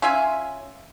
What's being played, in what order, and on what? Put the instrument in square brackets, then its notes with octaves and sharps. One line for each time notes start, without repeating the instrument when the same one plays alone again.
[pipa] C#4 F4 E5 G#5